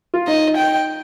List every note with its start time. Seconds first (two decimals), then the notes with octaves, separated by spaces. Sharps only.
0.14 F4
0.27 D#4 D#5
0.57 G5